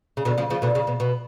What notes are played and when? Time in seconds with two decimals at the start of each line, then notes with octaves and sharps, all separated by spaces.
0.17 C#3
0.25 B2 D3
0.38 C#3 F3
0.50 C#3 F3
0.62 B2 D3
0.75 C#3
0.87 B2
1.00 B2